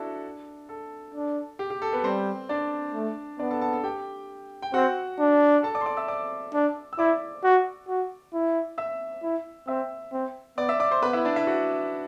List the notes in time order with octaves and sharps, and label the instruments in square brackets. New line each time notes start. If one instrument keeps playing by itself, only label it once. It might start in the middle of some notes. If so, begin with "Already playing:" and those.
Already playing: [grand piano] D4 E4 F#4 A4 D5 E5
A4
[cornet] D4
[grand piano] G4
G4
A4
B3 B4
[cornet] G3 [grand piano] C4 C5
[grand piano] D4 D5
[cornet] A3
[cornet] B3 [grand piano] D4 D5
[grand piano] A4 A5
A4 A5
A4 A5
G4 G5
G5
[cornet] C4 [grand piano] F#4 F#5
[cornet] D4
[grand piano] A4 A5
D5 D6
C6
D5 D6
E5 E6
D5 D6
[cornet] D4
[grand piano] E6
[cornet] E4 [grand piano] D5 D6
[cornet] F#4
F#4
E4
[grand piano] E5 E6
[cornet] E4
[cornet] C4 [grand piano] E5 E6
[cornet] C4
[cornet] B3 [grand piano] D5 D6
[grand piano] E5 E6
D5 D6
C5 C6
[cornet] B3 [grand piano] B4 B5
[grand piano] E4 E5
D4 D5
E4 E5
F#4 F#5